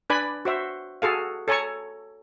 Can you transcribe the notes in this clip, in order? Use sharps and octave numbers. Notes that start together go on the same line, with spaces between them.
D4 B4 D5 G#5 B5
F#4 C5 E5
F#4 G#4 A4 F5
A4 C#5 G#5 A#5 C#6